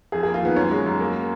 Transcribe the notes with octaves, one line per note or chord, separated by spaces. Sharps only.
F2 G#4
A#3 G#4
F4
D#3 B3
F#2 C#4
G#3
F#2
A#3